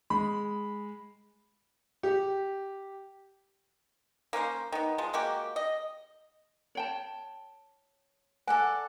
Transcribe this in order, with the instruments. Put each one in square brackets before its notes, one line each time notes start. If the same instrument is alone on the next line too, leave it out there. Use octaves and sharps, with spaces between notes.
[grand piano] G#3 B5
[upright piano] G4
[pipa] A#3 C#4 B4 C5
D#3 B3
F3 G#3
G#3 A#3 F#4 G4
D#5
[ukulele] C#5 G5 A5
[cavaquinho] A4 D5 F#5 [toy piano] G#5